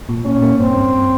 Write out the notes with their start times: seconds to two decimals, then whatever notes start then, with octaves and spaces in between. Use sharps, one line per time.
0.09 A#2
0.25 A#2 C#4
0.42 A#3
0.60 G2 C4
0.77 G2